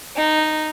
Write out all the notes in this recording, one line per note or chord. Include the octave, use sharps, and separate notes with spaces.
D#4